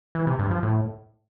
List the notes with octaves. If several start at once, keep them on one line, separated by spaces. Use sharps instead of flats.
E3
C3
G2
F3
A2